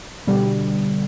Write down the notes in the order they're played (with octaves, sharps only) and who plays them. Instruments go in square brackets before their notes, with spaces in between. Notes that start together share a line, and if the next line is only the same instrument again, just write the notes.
[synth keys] B2 D3 G3